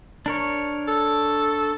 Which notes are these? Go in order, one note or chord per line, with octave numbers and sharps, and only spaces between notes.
D4 A#4 C#5
A4